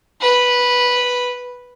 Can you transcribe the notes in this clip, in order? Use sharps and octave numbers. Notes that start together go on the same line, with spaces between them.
B4